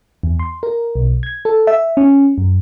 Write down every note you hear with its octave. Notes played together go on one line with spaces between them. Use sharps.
E2
C6
A#4
B1
G#6
A4
E5
C#4
F#2